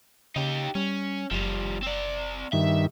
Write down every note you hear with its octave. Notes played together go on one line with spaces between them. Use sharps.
C#3 D#4 G4
G3 C#4
F#1 F3 G3
C4 D5
G2 D#3 E5